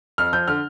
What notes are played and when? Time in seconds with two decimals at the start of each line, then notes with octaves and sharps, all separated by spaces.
0.18 F2 F6
0.33 F3 G6
0.48 D3 F6